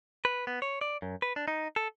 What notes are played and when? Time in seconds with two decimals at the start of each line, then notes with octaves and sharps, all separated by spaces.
0.25 B4
0.47 B3
0.62 C#5
0.81 D5
1.02 F#2
1.22 B4
1.36 D4
1.48 D#4
1.76 A4